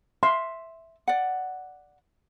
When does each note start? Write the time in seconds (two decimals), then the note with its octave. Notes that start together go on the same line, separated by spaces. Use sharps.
0.23 E5 C6
1.08 D5 F#5